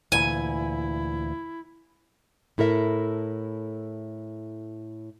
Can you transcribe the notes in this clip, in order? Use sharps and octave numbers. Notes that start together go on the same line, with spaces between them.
D2 A#2 E3 E4 G#5
A2 E4 A4 A#4 E5